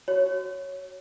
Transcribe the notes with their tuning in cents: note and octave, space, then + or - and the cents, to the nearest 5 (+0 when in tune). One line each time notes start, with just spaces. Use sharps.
F#4 +10 C#5 +0